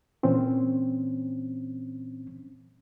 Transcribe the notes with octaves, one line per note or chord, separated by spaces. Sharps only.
A#2 E3 C4 C#4